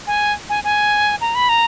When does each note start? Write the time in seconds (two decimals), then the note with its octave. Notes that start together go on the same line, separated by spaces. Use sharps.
0.07 G#5
0.50 G#5
0.64 G#5
1.21 A#5
1.35 B5
1.49 A#5